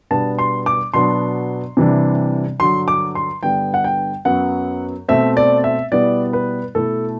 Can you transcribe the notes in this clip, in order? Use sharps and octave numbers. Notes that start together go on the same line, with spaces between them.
B2 G3 B3 D4 A5
C6
D6
B2 F#3 B3 D4 C6
C3 E3 G3 D4
G2 D3 F#3 C6
D6
C6
G2 D3 G3 B3 G5
F#5
G5
F#2 F#3 B3 F#5
B2 A3 C4 E5
D5
E5
B2 G3 B3 E4 D5
B4
B2 A3 E4 A4